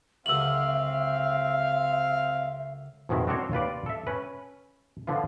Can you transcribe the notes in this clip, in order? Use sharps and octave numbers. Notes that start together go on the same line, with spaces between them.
C#2 F#2 D3 C4 E5 F5 E6 F#7
F2 B2 D#3 G#3 E4
C4 D4 F#4 A#4 C5 C#5
D#2 F4 B4 D5
A4 E5
C#4 B4
D3 F3 B3 F4